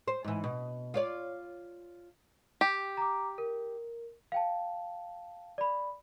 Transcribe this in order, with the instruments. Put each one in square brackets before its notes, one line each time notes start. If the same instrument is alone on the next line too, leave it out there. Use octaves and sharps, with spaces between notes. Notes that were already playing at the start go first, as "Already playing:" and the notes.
[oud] C5
G#2 E3
B2
F4 C#5 D5
[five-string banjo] G4
[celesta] A#5 D6
A#4
F5 G5 A5
D5 B5